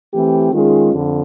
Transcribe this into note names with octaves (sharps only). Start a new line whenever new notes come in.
E3 A3 C4 E4 G4
D#3 G#3 C#4 F4 G#4
F2 D3